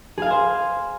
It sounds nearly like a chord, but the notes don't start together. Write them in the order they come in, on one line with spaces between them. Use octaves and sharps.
G#4 F5 G#5 C5